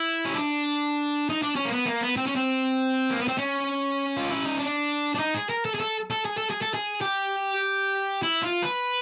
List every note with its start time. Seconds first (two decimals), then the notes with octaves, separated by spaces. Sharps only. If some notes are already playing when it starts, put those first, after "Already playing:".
Already playing: E4
0.25 C#4
0.35 D4
1.29 D#4
1.42 D4
1.56 C#4
1.65 A#3
1.71 B3
1.86 A#3
2.01 B3
2.17 C4
2.27 C#4
2.36 C4
3.10 A#3
3.20 B3
3.28 C4
3.38 C#4
4.17 F4
4.30 E4
4.45 D#4
4.59 D4
5.15 D4
5.19 D#4
5.34 G#4
5.50 A#4
5.65 A4
5.75 G#4
5.80 A4
6.10 A4
6.25 G#4
6.38 A4
6.50 G#4
6.62 A4
6.74 G#4
7.01 G4
8.23 E4
8.43 F4
8.63 B4